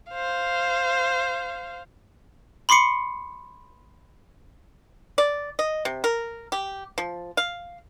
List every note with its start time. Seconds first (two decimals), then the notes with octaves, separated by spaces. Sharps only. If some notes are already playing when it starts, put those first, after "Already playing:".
0.11 C5 F5
2.69 B5 C6 D6 C7 C#7
5.18 D5
5.59 D#5
5.85 C3
6.04 A#4
6.52 G4
6.98 F3
7.37 F5